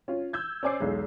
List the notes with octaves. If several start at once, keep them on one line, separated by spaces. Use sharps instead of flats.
C#4 F4
E6 G6 G#6
C#4 C5 D5 G#5 D6 C7
B1 E2 G#3